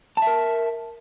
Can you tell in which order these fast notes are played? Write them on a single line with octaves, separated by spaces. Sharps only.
A5 E5 A#4